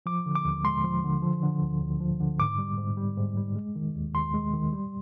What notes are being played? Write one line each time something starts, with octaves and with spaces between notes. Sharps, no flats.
F3 D6
D3
D6
D#2
G#3 C6
F3
D3
F3
D3
D2
D2
F3
D3
G#2 D6
G3
G#2
G3
G#2
G3
G#3
D#3
D#2
D#2 C6
G#3
D#3
G3